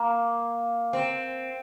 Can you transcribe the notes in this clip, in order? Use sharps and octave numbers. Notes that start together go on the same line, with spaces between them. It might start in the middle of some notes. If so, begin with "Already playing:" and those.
Already playing: A#3
C4